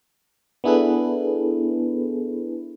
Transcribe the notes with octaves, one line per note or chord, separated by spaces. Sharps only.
B3 D4 E4 G#4 A4 B4